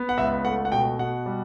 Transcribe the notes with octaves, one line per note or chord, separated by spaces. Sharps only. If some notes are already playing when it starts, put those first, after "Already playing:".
Already playing: B3
F#5
C#2 E5
A3 F#5
F#5
B2 G5
B2 F#5
G3